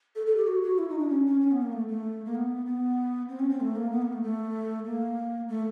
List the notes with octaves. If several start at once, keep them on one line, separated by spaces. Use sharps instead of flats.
A4
A4
G4
F#4
F#4
E4
D#4
D4
C#4
C#4
C#4
B3
A#3
A3
A3
A#3
B3
B3
C4
C#4
C4
A3
A#3
B3
A#3
A3
A3
A#3
A3